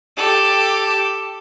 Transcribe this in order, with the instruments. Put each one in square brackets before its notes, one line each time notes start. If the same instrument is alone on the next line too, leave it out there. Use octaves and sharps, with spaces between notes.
[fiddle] G4 A4